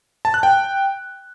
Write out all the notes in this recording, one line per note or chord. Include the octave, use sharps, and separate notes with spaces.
A5
F#6
G5